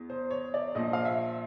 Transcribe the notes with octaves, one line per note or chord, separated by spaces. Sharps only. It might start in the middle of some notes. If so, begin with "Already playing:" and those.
Already playing: E2
C5
C#5
D5
A#1 A#2 F3 D#5
F5
E5